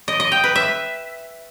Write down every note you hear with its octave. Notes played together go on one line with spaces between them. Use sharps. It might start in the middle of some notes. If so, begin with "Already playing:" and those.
D#5
D#5
G5
B4
E5